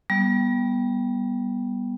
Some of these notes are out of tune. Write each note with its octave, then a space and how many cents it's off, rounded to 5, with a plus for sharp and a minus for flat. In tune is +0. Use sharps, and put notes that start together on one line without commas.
G3 +0 B3 -20